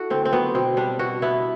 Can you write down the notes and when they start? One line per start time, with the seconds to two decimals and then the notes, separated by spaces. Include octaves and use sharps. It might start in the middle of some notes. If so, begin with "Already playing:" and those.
Already playing: E4 F#4 A4
0.10 D3 C4
0.25 C4
0.33 F#3 B3
0.55 B2 C4
0.77 G3 D4
0.99 B2 F#4
1.22 B3 E4